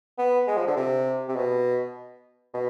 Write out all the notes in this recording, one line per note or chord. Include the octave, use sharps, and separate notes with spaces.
B3
G#3
F3
D3
C3
C3
B2
B2